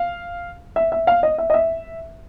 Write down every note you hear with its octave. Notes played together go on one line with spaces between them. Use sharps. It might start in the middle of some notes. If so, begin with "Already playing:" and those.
Already playing: F5
E5
E5
F5
D#5
E5
D#5
E5